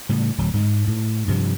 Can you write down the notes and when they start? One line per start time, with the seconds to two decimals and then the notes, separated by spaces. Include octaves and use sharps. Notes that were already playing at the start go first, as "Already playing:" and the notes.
0.09 A2 C#3 G3
0.38 D1 F#3
0.53 G#2 G#3
0.87 A2
1.28 G2 C3 F3